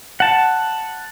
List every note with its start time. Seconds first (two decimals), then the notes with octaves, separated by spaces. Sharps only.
0.20 F#5 A5